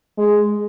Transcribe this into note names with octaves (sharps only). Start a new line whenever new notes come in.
G#3